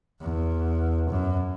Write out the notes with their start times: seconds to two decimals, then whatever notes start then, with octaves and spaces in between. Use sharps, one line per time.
0.21 E2
1.10 F#2